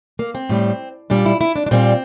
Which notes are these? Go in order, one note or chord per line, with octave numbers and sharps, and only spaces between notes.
A#3
C4
A2 G3
A#2 G3 D4
E4
E4
D4
D4
A#2 G3 C4